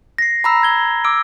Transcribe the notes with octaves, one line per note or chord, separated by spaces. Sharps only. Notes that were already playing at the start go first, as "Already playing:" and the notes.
A#6 C7
A#5 B5 E6
G#6 G7
D6 E6 D7